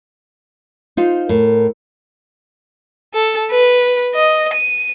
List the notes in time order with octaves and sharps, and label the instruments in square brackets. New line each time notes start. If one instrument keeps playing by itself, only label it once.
[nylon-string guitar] D#4 F4 C5
[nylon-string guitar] A2 [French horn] A#4
[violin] A4
B4
D#5
D#7